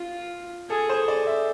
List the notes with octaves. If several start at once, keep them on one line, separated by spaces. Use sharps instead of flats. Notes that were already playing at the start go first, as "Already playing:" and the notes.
Already playing: F4
G#4 A4
C5
D5
E5